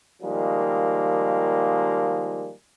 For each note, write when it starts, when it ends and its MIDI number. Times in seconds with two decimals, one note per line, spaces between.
0.22 2.52 51
0.22 2.52 53
0.22 2.52 55
0.22 2.52 56
0.22 2.52 58